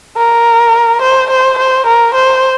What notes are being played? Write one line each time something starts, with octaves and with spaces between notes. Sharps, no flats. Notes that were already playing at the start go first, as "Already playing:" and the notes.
A#4
C5
C5
C5
A#4
C5